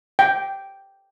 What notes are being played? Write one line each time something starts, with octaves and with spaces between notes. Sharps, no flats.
G5